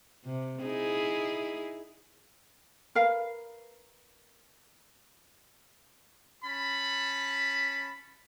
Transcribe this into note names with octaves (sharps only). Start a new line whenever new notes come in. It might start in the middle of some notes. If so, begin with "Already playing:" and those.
C3
D#4 E4 G#4
A#4 B4 F5
C#4 A5 B5